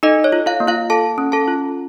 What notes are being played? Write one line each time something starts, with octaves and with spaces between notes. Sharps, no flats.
D#4 A4 D#5
C#5
F4
F4 F5
A#3
F4 F5
A4 A5
C#4
A4 A5
F4